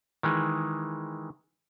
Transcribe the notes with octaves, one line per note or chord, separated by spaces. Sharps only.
D#3 E3 G#3